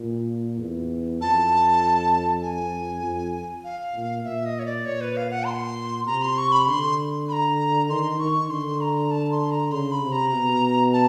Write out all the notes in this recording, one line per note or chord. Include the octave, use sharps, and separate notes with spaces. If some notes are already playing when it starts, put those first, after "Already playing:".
Already playing: A#2
E2
F2 A5
G#5
F2
F5
A#2
A#2 E5
D#5
C#5
D5
A#2 C#5
B4
F5
F#5
C6
C3 A#5
C6
C#6
B5
D3 C6
B5
A#5
D#3 C6
D#3 C#6
D3 C6
A#5
A5
C6
A#5
C#3 C6
B5
C3
A#5
B2
A5